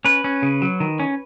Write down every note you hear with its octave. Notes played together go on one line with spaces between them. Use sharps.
C#4 B4
C#4
C#3
F#3
D#3
C#4